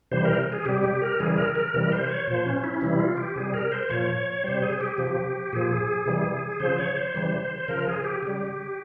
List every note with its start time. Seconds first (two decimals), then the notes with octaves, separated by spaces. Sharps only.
0.12 C3 E3 G3 C5
0.24 A#4
0.52 G#4
0.65 C3 G3 G4
0.83 G4
1.02 A#4
1.20 C#3 E3 G3 G#4
1.37 A#4
1.55 A#4
1.74 C3 E3 G3 A#4
1.92 C5
2.09 C#5
2.27 A#2 F3 C5
2.46 C#4
2.64 E4
2.74 C#4
2.81 C3 E3 G3 E4
3.00 F4
3.17 G4
3.36 C3 G3 G#4
3.54 A#4
3.72 C5
3.89 A#2 F3 C#5
4.44 C3 G3 C5
4.62 G#4
4.81 G4
4.98 C3 F3
5.53 A#2 F3 G#4
6.06 C3 E3 G3
6.60 C#3 F3 C5
6.79 C#5
6.96 C5
7.14 C#3 E3 G3
7.58 C5
7.68 C#3 F3 A#4
7.87 G#4
8.04 G4
8.22 C#3 G3 G4